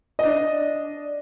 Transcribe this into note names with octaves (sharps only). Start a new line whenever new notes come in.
D4 D#5